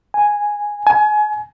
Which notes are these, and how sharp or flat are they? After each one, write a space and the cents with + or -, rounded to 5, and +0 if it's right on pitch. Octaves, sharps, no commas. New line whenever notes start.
G#5 -5
G#5 +30